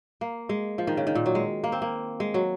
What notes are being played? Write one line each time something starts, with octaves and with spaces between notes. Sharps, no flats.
A#3
G#3
F3
D#3
C#3
D#3
A#2
F#3
G#3
A#3
C4
A#3
G#3
F#3